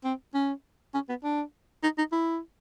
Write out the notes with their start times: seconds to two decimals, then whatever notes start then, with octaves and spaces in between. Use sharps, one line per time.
0.04 C4
0.34 C#4
0.94 C#4
1.09 B3
1.24 D4
1.84 D#4
1.98 D#4
2.12 E4